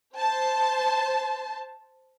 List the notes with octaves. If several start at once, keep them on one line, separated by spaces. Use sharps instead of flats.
C5 A5